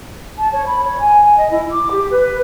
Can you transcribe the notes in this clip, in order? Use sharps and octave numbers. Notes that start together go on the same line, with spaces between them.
A5
C#5
B5
C#5
G#5
D#5
E4
D6
G4
B4